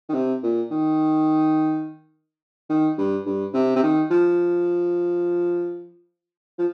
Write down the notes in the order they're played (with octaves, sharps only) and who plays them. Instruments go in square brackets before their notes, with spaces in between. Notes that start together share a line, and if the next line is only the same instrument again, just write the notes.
[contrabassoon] D#3
C3
A#2
D#3
D#3
G2
G2
C3
C3
D#3
F3
F3